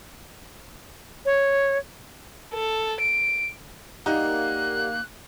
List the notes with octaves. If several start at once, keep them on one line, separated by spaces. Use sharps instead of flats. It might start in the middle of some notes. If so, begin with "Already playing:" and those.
C#5
A4
D7
A#3 D#4 G4 D5 F#5 F#6